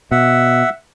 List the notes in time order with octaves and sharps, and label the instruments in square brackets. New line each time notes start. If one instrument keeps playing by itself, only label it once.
[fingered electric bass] B2 [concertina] E5 F#5